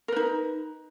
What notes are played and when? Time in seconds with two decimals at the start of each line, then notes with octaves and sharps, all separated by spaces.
0.08 A#4
0.12 B4
0.16 D#4